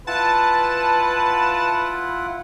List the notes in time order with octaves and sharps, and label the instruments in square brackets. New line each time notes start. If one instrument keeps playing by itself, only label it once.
[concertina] E4 F4 F#5 [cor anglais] B4 [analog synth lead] A5